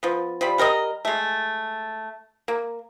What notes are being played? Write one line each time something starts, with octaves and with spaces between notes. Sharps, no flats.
F3 B3
F3 G3 B5
G3 A#4 C#5 D#5
G#3 A3
A#3